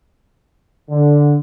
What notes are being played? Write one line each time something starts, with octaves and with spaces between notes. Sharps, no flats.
D3